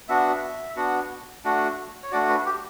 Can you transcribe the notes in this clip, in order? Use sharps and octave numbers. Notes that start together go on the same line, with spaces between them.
B3 D4 F#4 E5
B3 D4 F#4
A3 D4 F#4
C#5
A3 D4 F#4 D5
B4
G4